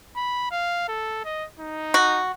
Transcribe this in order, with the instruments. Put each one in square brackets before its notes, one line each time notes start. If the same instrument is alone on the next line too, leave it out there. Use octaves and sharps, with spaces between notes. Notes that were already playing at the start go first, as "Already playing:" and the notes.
[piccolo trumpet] B5
F5
A4
D#5
D#4
[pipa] F#4